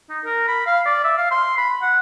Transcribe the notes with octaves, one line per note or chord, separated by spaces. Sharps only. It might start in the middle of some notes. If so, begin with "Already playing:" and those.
D#4
A#4
B5
F5
D5
E5
F5
C6
B5
F#5